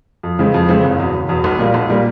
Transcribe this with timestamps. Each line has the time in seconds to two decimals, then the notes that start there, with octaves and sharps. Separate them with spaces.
0.23 F2
0.39 C#3 E3 G#3 C4
0.54 F2
0.69 C#3 E3 G#3 C4
0.84 F#1
0.99 E2 B2
1.14 F#1
1.29 E2 B2
1.44 B1
1.59 A#2 G3 A#3
1.74 B1
1.90 A#2 G3 A#3